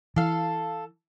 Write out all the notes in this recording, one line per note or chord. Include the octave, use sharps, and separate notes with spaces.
E3 A4 F5